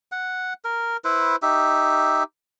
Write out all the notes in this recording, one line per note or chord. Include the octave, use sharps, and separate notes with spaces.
F#5
A#4
E4 B4 C5
D#4 G4 E5